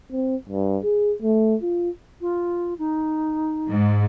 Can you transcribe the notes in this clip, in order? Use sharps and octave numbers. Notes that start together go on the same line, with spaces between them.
C4
G2
G#4
A3
F4
F4
D#4
G#2